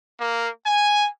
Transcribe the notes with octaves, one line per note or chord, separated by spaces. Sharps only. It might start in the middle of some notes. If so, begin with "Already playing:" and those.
A#3
G#5